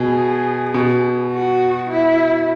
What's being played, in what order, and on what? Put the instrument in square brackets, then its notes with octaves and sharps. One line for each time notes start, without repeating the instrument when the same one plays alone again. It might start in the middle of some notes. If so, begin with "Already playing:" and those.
Already playing: [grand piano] B2 [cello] G#4
[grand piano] B2
[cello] F#4
E4